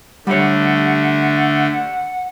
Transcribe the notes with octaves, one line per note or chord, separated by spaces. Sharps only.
D3 G3 A3 C#5 F#5